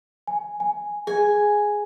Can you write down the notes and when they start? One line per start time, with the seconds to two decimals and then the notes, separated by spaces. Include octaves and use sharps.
0.27 G#5
0.60 G#5
1.07 G#4 G#5